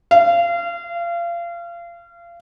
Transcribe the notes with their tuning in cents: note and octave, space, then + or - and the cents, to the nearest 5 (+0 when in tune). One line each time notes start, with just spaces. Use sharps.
F5 -30